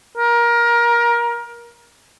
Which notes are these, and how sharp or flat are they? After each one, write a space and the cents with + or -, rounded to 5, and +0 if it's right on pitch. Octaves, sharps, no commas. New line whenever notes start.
A#4 +20